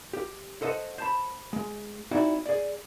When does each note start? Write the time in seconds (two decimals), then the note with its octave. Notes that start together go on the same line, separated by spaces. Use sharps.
0.13 G4
0.62 A4 C5 D#5 F#5
0.98 C5 A5 B5
1.53 G#3
2.11 C4 D#4 E4 F#4 D5
2.46 G#4 D5